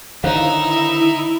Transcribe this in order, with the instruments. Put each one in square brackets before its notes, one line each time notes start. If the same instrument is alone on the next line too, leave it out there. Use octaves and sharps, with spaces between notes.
[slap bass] D3 D#3 [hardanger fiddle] D#4 E5 [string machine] E4 [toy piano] C5 C#5 F5